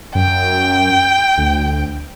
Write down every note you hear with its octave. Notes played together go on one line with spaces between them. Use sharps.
F#2 G5
D2